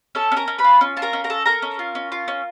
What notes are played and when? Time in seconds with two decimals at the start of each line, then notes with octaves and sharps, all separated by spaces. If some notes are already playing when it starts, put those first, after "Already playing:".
0.15 C#4 A4 A5
0.32 C#4
0.37 A#4 A#5
0.48 C#4
0.59 B4 B5
0.64 F4
0.81 C#4
0.97 F4 A5
1.02 A#4 A#5
1.13 C#4
1.24 A#4 A#5
1.30 A4
1.46 A4 A#4 A#5
1.62 C#4
1.79 F4
1.95 C#4
2.12 F4
2.28 C#4